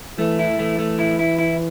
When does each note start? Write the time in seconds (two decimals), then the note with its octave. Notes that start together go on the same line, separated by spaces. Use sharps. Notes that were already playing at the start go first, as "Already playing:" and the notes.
0.18 E3 A3
0.39 E4
0.58 E3 A3
0.79 A3
0.99 E4
1.19 E4
1.39 E4